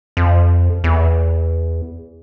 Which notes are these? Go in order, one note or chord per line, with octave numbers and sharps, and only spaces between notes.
F2
E2